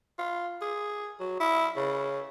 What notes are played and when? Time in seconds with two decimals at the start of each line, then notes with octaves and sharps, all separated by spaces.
0.18 F4
0.62 G#4
1.20 F#3
1.40 E4
1.76 C#3